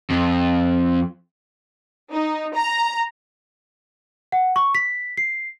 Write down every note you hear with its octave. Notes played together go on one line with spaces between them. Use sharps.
F2
D#4
A#5
F#5
C#6
B6
C7